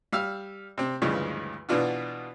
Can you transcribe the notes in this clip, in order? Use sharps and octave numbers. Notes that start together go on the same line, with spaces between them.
G3 F5 E6 F6
C3 C4
D2 G2 C#3 E3 F3 G#3
B2 E3 B3 D4 F4 F#4